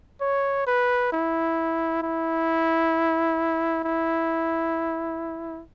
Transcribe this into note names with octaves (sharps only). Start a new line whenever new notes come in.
C#5
B4
E4
E4
E4